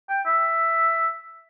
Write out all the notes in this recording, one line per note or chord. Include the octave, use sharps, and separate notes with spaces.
G5
E5